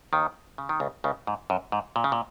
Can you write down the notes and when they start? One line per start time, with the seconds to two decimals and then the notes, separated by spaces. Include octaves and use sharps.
0.13 D#2 D#3
0.58 C#3
0.69 D#3
0.80 C#2 C#3
1.04 C#2 C#3
1.27 G#2
1.50 F#2
1.72 G#2
1.96 A#2
2.04 C#3
2.12 A#2